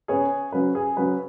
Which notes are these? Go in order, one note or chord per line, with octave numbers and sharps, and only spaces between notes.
C#3 B3 G#4 C#5
C#3 F#3 C#4 B4
G#4
C#3 F#3 C#4 B4